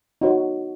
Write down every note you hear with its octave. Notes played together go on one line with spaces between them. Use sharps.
D#4 F#4 C#5 F#5